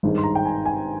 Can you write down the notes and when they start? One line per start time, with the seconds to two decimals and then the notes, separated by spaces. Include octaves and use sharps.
0.03 G#1 G2 D#3 G#3
0.18 C6
0.23 A#5
0.35 G5
0.45 G#5
0.65 G#5